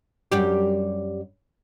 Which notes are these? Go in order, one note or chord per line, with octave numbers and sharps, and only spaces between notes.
F#2 G3 G4